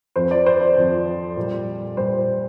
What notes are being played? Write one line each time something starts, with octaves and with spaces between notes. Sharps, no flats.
F2 F3 C5
D5
C5
D5
F2 F3
A#2 G3
A#2 G3 C5